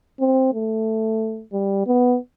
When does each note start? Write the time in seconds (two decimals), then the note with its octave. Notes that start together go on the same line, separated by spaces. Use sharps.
0.20 C4
0.54 A3
1.53 G3
1.87 B3